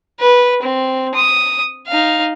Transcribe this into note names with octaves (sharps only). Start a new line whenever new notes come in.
B4
C4
D#6
D#4 F5